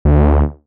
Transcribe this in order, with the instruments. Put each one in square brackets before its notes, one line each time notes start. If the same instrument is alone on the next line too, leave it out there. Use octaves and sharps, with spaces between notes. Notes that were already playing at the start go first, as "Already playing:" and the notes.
[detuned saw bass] D2